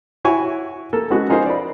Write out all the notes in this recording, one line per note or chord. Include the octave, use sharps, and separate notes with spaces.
E4 F#4 C#5 G#5 C#6
A#3 A4
G#3 B3 C#4 F#4
C#4 D#4 F4 G#4 A#4 C5
D5 B5